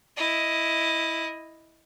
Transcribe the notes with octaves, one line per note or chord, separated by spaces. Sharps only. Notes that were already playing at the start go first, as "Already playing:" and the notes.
E4 D#5